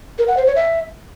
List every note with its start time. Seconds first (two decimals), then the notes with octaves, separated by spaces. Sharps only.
0.18 A#4
0.28 F#5
0.37 C5
0.46 C#5
0.56 E5